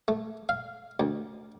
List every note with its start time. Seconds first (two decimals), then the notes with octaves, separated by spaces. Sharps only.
0.08 A3
0.49 F5
1.00 D2